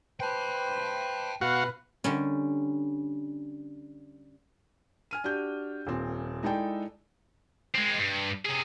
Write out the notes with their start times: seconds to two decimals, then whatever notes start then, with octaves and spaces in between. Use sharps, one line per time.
0.20 B4 C5 G5 A5
1.41 B2 F#4 B4 F5 F#5
2.04 D3 G3 C#4
5.11 G#5 F6 D#7
5.24 D4 F#4 G4 G6
5.87 D#1 A#2 C4
6.43 G#3 D#4 E4 A4 D5 G5
7.75 G#3 C4
7.99 G2
8.45 C3 G#4